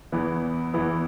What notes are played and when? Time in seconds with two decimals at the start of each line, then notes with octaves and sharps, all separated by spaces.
0.12 E2 E3 B3
0.74 E2 E3 B3